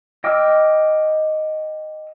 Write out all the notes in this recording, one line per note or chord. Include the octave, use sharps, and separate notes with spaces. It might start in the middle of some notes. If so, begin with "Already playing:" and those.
D#5 G5 D6 E6 F6